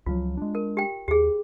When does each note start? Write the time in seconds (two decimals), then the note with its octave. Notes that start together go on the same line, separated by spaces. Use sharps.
0.06 C#2 F3 F#3 F4
0.37 G#3 D4
0.55 A#4
0.77 G4 G5
1.08 D#2 G4 G#4